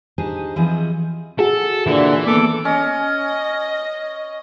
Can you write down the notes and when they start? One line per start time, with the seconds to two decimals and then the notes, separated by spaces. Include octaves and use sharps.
0.18 D4 D#4 G4 G#4 C5 D#5
0.56 E3 F3 C4 F4 G#4 D#5
1.39 F#4 G#4 A4
1.87 A#2 D3 E3
2.27 A#3 B3 A4 D6
2.65 C#4 D#5